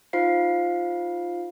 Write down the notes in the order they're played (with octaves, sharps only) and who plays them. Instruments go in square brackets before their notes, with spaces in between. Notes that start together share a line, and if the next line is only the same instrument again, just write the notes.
[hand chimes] D#4 F4 C5 F5 C7